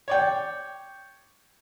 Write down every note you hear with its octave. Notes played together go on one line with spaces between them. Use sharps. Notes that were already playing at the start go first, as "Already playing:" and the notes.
C#5 D5 G5